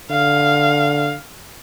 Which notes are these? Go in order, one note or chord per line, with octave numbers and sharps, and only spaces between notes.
D3 F5